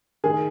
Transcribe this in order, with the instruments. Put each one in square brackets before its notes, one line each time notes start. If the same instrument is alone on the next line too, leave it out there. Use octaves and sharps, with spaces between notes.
[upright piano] D#3 G#4 G#5